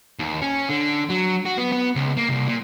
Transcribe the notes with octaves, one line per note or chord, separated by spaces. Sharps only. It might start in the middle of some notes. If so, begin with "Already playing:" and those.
D#2
C#4
D3
F#3
F#4
B3
B3
C#2
A#3
C2
A#2